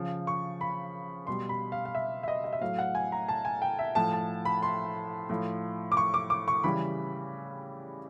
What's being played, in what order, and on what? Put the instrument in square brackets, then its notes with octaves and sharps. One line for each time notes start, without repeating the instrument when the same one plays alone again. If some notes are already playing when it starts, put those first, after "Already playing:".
Already playing: [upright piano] C#3 F3
C#6
B5
B2 G3 C6
B5
F5
F5
E5
E5
D#5
D#5
E5
A2 F#3 F5
F#5
G#5
A#5
A5
G#5
G5
E5
A2 F3 A5
A5
B5
C6
A2 F3
D6
C#6
D6
D6
C#6
C#3 E3 G3 B5